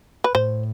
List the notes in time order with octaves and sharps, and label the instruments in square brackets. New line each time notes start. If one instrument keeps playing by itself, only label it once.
[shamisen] B4
[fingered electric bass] A2 [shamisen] C5